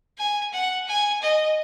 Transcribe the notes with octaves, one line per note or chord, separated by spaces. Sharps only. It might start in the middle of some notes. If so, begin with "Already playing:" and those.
G#5
F#5
G#5
D#5